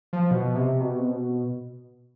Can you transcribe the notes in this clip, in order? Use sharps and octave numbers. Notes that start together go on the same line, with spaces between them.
F3
B2
C3
B2
C3
B2